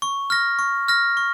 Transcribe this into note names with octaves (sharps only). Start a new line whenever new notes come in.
C#6
F6 A#6
C#6
F6 A#6
C#6